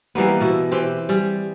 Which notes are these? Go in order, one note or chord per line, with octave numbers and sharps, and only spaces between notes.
E3 G3 A#3 B3
B2 E4
E3 C4 G4
G3 G#4